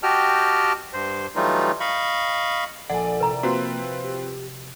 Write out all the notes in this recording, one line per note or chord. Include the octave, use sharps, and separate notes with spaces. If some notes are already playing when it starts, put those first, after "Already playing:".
F#4 G4 D#5 G5 A5 F6
G2 C5
E3 F#3 G3 A3 D#4 F4
D#5 F5 B5 C#6
A#1 A4 D5 F#5 G#5
C3 E4 A#4 A#5
A#3 C4 F4 F#4 B4
G4